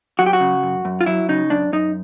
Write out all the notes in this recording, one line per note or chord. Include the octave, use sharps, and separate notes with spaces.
F#3 F#4
G4
F#4
C#3
F#2
F#2
F4
F#3 E4
C#3 D#4
F#2 D4
F#2 D#4